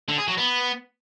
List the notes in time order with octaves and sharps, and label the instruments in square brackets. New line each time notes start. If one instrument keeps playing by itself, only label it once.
[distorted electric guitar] D3
G#4
F#3
B3